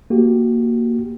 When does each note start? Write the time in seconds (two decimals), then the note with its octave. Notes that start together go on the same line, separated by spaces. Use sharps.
0.10 A#3 F#4 G4